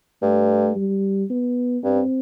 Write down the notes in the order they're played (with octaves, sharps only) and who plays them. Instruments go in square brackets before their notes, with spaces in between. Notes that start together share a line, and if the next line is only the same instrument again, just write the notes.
[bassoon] G2 [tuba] A3
[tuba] G3
B3
[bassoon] G2 [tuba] C4